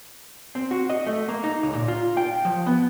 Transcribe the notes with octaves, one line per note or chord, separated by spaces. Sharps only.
C4
F#4
D#5
A3
A#3
D#4
C#2
A#2
F4
G5
F3
B3